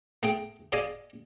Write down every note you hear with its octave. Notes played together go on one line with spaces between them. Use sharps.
A3 G#4 G5
G#4 D5 D#5 F5 G#5